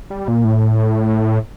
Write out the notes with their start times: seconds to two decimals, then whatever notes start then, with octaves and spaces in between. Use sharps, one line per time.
0.10 G3
0.28 A#2
0.44 A2